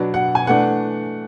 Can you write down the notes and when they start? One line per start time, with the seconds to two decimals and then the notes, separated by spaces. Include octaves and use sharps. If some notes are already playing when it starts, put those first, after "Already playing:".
Already playing: B2 F#3 B3 D4
0.14 F#5
0.35 G#5
0.47 E3 A3 D4 F#5